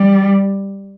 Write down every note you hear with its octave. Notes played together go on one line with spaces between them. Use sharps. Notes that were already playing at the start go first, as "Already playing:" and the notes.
Already playing: G3